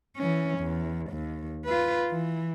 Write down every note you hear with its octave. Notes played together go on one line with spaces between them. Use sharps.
E3 C#4
E2
D#2
F4 B4
E3